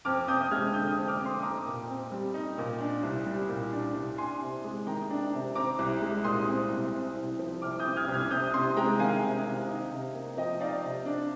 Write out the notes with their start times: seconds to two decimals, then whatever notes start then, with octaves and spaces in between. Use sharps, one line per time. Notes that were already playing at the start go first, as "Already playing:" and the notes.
0.05 F2 D6 F6
0.28 F2 D#6 G6
0.51 G#3 F6 G#6
0.73 D3 D#6 G6
0.97 F2
1.08 D6 F6
1.20 F2
1.25 C6 D#6
1.43 D#4 A#5 D6
1.66 A#2
1.89 C4
2.12 G3
2.34 D#4
2.58 A#2
2.81 D4
3.03 C2
3.26 G3
3.49 A#2
3.73 D4
3.95 C2
4.18 D4 G#5 C6
4.41 C3
4.64 G#3
4.87 D#3 G5 A#5
5.10 D4
5.33 C3
5.55 C4 A#5 D6
5.79 C2
6.02 G#3
6.24 A#2 C6 D#6
6.48 C4
6.70 C2
6.93 C4
7.17 C2
7.39 F3
7.62 C3 D6 F6
7.79 D#6 G6
7.85 C4
7.96 F6 G#6
8.08 C2
8.14 F6 G#6
8.30 C3 D#6 G6
8.54 C3 C6 D#6
8.77 G#3 G5 A#5
9.00 D#3 F5 G#5
9.23 C3
9.45 C3
9.69 D#4
9.91 C3
10.15 A#3
10.37 F3 D#5 G5
10.60 D#4 D5 F5
10.83 C3
11.06 D4